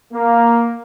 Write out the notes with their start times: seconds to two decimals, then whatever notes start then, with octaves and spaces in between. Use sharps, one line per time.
0.12 A#3